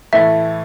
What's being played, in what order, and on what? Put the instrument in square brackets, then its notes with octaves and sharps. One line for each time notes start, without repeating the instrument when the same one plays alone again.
[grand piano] A2 E3 A3 [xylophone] E5